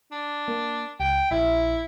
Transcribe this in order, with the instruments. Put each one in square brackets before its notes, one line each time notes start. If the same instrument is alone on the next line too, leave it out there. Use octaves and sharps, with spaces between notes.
[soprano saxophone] D4
[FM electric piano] A#3
[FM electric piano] C#2 [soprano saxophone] G5
[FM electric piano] A#1 E5 [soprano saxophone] E4